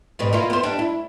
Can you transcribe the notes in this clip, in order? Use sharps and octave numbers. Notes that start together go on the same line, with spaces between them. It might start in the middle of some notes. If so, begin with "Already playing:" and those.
G#2 B2 G3
A#3 E4 F4
B3 C5
G3 D4
E4